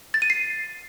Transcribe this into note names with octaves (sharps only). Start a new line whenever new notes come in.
A6
D#7
C7